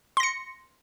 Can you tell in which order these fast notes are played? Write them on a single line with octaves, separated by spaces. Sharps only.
C6 A#6 C#7